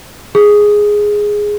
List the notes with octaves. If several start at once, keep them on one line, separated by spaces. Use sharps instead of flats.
G#4